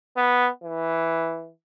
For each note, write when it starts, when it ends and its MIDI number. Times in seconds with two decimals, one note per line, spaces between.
0.16 0.49 59
0.63 1.50 52